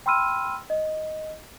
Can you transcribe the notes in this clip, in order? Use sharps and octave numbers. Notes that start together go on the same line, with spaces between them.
G5 B5 C6 E6 F6 D#7
D#5